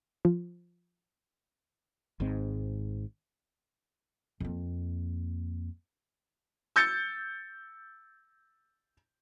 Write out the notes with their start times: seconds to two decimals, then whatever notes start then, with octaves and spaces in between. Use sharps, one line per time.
0.25 F3
2.20 G#1 G#2 G#3 C4
4.40 F2 A#3
6.76 E6 G6 A6 C#7